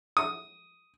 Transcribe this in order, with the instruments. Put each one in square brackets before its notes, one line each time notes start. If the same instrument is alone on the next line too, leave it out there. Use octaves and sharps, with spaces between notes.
[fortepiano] D#6